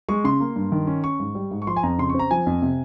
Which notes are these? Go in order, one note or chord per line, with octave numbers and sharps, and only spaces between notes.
G#3 C#6
C#3 C6
A#3
G2
D#3
C#4
C#4 C#6
G#2
G3
G#2
C#6
F3 C6
G#5
F2 A#5
C#3 C6
C#6
C4
A#5
F3 G#5
F2
C3